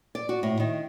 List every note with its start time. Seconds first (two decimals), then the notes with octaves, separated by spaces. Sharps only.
0.15 D5
0.29 F#4
0.43 A2
0.60 D#3